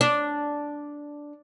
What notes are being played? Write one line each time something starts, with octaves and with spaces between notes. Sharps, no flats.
D4